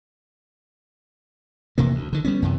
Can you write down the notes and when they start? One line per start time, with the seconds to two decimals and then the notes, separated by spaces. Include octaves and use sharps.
1.78 F1 C3 E3 A#3
1.95 D2
2.13 D3 D#3
2.25 G3 B3 C#4
2.42 F#2 C3 E3